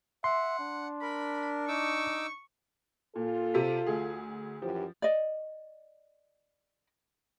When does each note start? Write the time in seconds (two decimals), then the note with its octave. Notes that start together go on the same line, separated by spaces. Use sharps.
0.24 E5 F#5 C6
0.60 D4
1.02 A#4 B5
1.68 D#4 C#6 D6 E6
3.16 A#2 F4 A4
3.54 C3 B6
3.87 D2 G#4
4.62 F#2 E3 F3 G4
5.02 D5 D#5